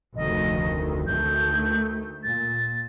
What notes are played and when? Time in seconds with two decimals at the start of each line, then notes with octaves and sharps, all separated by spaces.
0.16 F1 D2 D#3 D#5
1.07 D2 D#3 A3 G6
2.23 A#2 A6